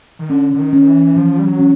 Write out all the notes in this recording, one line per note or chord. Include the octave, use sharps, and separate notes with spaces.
D#3
D3 C#4
D3
D#3
C#4
E3
E3 F3
G3
F#3
C#4